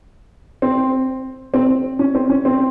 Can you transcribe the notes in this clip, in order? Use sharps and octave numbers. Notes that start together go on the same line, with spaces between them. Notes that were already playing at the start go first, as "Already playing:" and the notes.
C4
C4
C#4
C4
C#4
C4